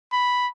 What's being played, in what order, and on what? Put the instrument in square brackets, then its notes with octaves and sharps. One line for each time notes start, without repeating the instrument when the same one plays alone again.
[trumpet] B5